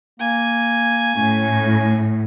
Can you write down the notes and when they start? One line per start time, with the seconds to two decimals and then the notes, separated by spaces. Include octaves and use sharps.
0.20 A#3 G#5
1.16 A2 C#4